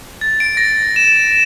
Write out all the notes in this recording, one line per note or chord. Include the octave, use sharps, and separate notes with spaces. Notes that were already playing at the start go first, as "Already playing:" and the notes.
A6
D7
A#6
E7